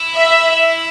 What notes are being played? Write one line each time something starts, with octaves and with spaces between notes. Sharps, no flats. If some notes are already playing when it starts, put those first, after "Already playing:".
Already playing: E4
E5